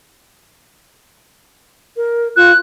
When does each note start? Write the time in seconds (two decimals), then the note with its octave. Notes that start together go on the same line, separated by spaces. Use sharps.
1.97 A#4
2.36 F4 F#6